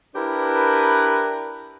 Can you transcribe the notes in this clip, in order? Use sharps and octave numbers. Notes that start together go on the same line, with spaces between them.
D4 E4 G4 A#4 B4